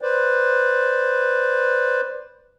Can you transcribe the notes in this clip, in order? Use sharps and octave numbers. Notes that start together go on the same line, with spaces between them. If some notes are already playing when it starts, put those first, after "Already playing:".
B4 C5 D5